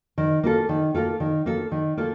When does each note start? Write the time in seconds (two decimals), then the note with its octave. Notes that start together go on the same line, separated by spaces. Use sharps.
0.18 D#3
0.43 A#3 F4 A4
0.69 D#3
0.95 A#3 F4 A4
1.20 D#3
1.46 A#3 F4 A4
1.72 D#3
1.97 A#3 F4 A4